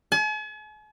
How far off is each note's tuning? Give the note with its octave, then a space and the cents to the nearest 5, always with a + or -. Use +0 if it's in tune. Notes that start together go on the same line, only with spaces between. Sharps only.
G#5 +45